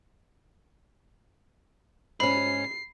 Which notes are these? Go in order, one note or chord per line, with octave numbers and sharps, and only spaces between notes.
G#2 C#4 B5 C7